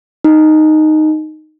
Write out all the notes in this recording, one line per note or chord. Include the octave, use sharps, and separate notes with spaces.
D#4